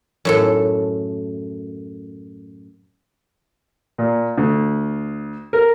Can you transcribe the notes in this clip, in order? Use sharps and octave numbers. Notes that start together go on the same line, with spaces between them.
F#2 A2 A4
A#2
D2
A#4